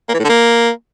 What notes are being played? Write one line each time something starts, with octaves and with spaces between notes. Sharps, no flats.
A#3
E3
A2
D3
A#3